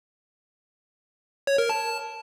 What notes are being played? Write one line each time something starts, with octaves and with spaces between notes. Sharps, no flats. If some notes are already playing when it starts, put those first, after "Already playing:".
C#5
A#4
A5